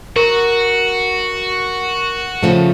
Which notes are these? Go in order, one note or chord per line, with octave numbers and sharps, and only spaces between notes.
F#4 A#4
C#3 F3 A3